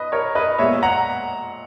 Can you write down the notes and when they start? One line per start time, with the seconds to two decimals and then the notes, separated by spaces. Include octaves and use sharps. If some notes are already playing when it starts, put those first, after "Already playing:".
Already playing: B4 D#5
0.12 A#4 C#5
0.35 B4 D#5
0.59 A#2 G#3 B3 C#5 E5
0.83 F#5 A#5